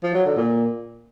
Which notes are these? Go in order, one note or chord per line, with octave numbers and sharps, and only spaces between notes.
F3
F#3
D3
A#2